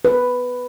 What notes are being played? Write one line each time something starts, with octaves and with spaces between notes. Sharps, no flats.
B4